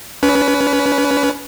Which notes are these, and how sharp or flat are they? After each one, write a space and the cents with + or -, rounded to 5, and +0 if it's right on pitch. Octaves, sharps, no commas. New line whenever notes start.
C#4 +35 B4 +0